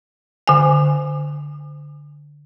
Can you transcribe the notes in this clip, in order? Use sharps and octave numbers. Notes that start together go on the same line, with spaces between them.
D3 G#5